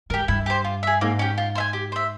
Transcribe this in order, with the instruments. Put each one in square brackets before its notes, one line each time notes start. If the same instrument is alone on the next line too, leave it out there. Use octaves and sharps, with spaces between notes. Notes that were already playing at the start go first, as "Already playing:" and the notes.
[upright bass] G#2 [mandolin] G4 A#4
[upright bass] G2 [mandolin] E4
[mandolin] G4 C5
F4
G#4 E5
[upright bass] G#2 [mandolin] A#3
[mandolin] C#4 G4
F4
C5 E5 G#5
G4
C5 E5